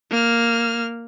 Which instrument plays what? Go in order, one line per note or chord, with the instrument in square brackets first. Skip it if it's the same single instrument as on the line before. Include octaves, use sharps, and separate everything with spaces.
[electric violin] A#3 F6